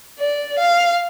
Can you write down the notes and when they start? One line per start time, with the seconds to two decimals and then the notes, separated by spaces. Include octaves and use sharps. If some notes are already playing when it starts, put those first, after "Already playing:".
0.19 D5
0.58 F5